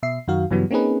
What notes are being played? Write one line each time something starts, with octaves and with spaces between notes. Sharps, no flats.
B2 E5 C7
F#2 D#3 F#4 F5
G2 C#3 E3 F#3 G3 B3
A#3 C4 C#4 D#4 G#4 B4